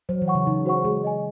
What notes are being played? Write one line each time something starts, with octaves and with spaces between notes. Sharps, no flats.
F#3 C5
E3
F#5 C#6
C#3
C#3 D#4
F#4 C5 F#5 C#6
G#3 G#4
D#5 G#5